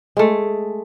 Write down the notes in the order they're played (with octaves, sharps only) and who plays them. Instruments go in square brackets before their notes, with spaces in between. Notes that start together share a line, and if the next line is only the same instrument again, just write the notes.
[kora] G#3 A3